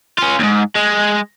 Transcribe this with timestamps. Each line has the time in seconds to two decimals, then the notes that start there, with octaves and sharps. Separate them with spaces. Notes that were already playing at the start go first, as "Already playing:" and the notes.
0.18 C#4 F4
0.39 D#2 G#2
0.75 G#3